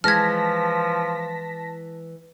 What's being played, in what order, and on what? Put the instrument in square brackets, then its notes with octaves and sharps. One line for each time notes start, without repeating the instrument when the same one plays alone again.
[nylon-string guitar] E3 G#3 [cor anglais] F3 [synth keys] A5 A#6 B6 [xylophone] F6 G#6